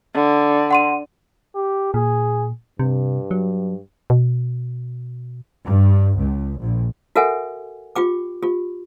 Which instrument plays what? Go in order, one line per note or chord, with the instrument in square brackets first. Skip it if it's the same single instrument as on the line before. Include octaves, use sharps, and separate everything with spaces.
[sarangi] D3
[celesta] F#5 C6 D#7
[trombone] G4
[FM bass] A#2 [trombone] G#4
[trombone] G2 [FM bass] C3
[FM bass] F#3
B2
[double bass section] G2
C#2
A#1
[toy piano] F#4 A4 A#4 E5 F#5 G#5
F4 G4 G5 D6
F4 G4